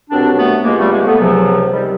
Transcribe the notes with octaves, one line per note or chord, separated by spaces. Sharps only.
C2 B2 F#3 C4 D4
A3 B3
C#2 C3 F3 G#3 A#3
G3 A3
G#3 A#3
A3 B3
C#2 C3 F3 F#3
C3 D#3 F#3 G3